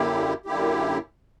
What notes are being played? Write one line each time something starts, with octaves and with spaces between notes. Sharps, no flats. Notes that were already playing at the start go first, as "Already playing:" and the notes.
Already playing: F#2 D3 A#3 E4 G4
F#2 D3 A#3 E4 G4